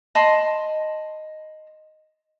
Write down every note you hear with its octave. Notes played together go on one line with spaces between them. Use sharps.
D#5 A5 B5 C6